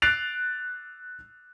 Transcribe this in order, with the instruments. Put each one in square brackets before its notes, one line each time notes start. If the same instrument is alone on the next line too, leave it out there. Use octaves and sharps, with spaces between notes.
[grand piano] F#6 A6 C7 D7 F7